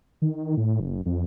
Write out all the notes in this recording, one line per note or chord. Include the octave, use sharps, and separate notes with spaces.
D#3
A2
F#1
F2